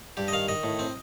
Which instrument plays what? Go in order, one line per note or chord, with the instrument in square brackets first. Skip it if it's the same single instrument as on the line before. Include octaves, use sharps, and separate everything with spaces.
[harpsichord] G2 G4
D#5
D#3 F5
D#3 D#5
A2
C4